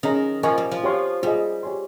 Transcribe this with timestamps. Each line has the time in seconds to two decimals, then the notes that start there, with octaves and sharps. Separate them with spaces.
0.03 D#3 C#4 G#4 D#5 A#5
0.43 F3 A#4 D#5 G#5 C#6
0.58 G3
0.72 F3
0.84 G4 C#5 F5 C6
1.23 G3 F4 G#4 D#5
1.63 G4 C#5 G#5 C6